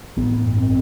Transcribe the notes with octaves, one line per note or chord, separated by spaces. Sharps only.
A1 B3
G2
C4